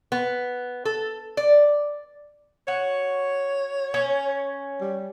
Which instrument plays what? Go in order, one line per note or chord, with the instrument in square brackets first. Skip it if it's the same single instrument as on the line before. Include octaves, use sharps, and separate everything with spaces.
[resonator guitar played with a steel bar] B3
A4
D5
[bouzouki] F#4 [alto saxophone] C#5
[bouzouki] C#4
[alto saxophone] G3